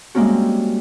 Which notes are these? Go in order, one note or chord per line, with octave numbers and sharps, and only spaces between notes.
G3 G#3 A#3 C4 C#4 F#4